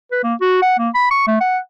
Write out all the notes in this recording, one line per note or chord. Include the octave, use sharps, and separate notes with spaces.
B4
A#3
F#4
F#5
A#3
B5
C#6
A3
F#5